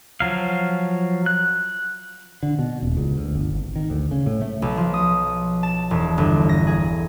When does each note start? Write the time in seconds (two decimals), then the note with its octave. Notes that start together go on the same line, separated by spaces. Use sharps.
0.20 F3 F#3 F5
1.26 F#6
2.43 D3
2.59 B2
2.82 D#1
2.97 C#2
3.18 D2
3.35 G1
3.55 G#1
3.76 D#3
3.90 D2
4.11 C#3
4.26 A2
4.42 A3
4.62 B1
4.77 F3
4.94 D#6
5.63 A5
5.91 E1
6.18 G1
6.49 A#6
6.67 G#4